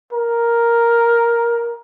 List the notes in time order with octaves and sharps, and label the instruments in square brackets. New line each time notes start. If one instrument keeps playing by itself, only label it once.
[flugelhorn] A#4